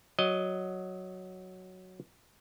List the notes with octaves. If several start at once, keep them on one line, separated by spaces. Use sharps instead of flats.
F#3 D#5